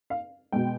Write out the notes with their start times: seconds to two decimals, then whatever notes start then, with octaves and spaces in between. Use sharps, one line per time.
0.10 F5
0.52 B2 G#3 G5